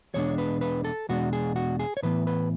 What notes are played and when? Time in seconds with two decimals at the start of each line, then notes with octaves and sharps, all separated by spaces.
0.14 E2 B2 G#3 D4 C#5
0.38 B4
0.61 B4
0.84 A4
1.09 E2 B2 G#3 D4 F#4
1.33 G#4
1.56 F#4
1.79 G#4
1.97 C#5
2.03 A2 E3 B3 B4
2.27 B4